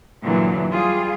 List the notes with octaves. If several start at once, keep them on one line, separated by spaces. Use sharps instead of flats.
G2 A#2 D3 E3 F#3
G3 F4 G#4